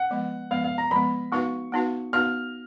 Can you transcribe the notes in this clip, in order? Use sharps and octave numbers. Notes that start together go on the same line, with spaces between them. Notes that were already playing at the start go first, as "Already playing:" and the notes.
Already playing: F#5
F3 G#3 B3
F3 G#3 B3 F5
F5
A#5
F3 G#3 B3 B5
B3 D#4 F#4 B4 F5 C#6
B3 D#4 F#4 B4 F5
B3 D#4 F#4 B4 F5 F6